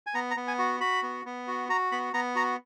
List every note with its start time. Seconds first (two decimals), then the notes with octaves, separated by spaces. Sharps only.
0.07 G#5
0.14 B3 A#5
0.31 A#5
0.36 B3
0.48 G#5
0.59 F#4
0.80 F#4 B5
1.03 B3
1.25 B3
1.48 F#4
1.69 F#4 A#5
1.92 B3 B5
2.14 B3 A#5
2.35 F#4 A#5